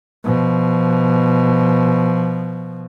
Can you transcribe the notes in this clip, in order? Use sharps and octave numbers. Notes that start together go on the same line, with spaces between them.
B2 F3